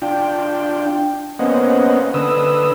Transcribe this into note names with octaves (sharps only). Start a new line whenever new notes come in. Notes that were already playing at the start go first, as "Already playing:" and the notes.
D4 F4 G5
A#3 B3 C#4 C5 D#5 F#5
D3 B4 D#6 E6